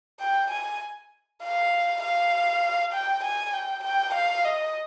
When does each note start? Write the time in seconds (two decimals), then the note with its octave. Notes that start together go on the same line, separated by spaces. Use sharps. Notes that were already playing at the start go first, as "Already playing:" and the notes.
0.20 G5
0.51 G#5
1.42 F5
2.03 F5
2.93 G5
3.24 G#5
3.54 G5
3.84 G5
4.14 F5
4.45 D#5